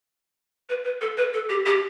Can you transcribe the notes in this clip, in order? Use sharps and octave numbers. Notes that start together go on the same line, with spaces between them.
B4
B4
A4
B4
A4
G4
G4